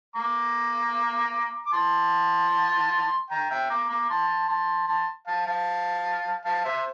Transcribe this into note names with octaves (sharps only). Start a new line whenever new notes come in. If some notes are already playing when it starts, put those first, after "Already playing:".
A#5 D6
D6
A5 C6
G5 A#5
E5 G5
A#5 D6
A#5 D6
A5 C6
A5 C6
A5 C6
F5 A5
F5 A5
F5 A5
C5 E5